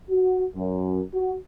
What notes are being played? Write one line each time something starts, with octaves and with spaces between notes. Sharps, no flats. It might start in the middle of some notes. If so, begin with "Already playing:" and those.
F#4
F#2
F#4